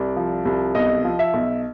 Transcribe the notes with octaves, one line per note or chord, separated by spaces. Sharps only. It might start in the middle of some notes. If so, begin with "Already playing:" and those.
Already playing: C2 D5
F3
C2
B1 D#5
F3
E5
B1